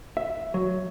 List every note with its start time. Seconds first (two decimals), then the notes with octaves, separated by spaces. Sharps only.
0.17 E5
0.54 F#3